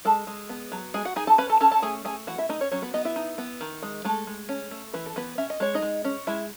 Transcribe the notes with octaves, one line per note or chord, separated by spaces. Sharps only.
G#3 A4 A5
G#3
B3
F#3
G#3 G#4 G#5
F#4 F#5
D#4 G#4 G#5
A4 A5
C#4 B4 B5
A4 A5
C#4 A4 A5
A4 A5
A3 G#4 G#5
A3 G#4 G#5
E3 F#4 F#5
E4 E5
A3 D#4 D#5
C#4 C#5
F#3 C#4 C#5
B3 B4
B3 D#4 D#5
E4 E5
D#4
B3
D#3
G#3
G#3 A3 A4
G#3
C#4
A3
E3 B4
A4
E3 B3 B4
C#4 E5
D#5
G#3 C#5
D#4 D#5
G#3
C#4
G#3 E4 E5